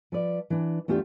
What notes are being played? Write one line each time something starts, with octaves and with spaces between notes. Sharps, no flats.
F3 B4 D5
E3 D4
E2 A3 D4 F4 G4